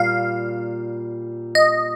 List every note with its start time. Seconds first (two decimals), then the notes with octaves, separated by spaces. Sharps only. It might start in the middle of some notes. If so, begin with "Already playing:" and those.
Already playing: A#2 G3 F5
1.55 D#5